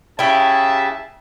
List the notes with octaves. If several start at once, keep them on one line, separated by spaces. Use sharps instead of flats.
C#3 E4 G4 E5 A5